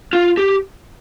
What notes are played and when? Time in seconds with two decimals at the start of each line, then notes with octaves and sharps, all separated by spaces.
0.13 F4
0.37 G4